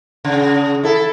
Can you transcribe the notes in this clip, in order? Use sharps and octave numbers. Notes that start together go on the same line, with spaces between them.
C#3
E4 A4